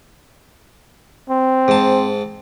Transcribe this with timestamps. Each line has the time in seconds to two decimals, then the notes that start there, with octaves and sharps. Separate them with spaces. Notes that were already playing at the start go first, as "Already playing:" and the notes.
1.29 C4
1.68 G#2 A5